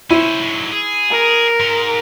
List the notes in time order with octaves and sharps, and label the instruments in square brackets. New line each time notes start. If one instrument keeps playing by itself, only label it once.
[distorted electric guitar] C#4 C5 [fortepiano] E4
[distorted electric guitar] G#2 F#3
G#4
[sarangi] A#4
[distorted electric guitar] G#2